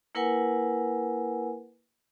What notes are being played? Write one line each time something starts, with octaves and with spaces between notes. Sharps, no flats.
A#3 E4 A#4 B4 F#5 G#5